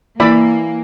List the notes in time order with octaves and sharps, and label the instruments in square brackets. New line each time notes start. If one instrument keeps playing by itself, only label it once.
[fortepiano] E3 [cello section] A#3 [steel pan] D5 E5 B5